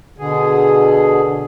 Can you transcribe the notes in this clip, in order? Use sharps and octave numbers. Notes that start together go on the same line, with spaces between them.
B2 D3 G#4